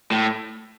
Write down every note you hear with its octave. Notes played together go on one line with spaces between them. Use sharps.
A2